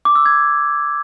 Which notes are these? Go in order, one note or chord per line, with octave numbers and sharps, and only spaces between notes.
D6
E6
G#6